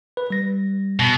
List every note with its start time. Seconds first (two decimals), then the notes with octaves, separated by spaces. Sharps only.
0.17 B4
0.30 G3 A#6
0.99 B2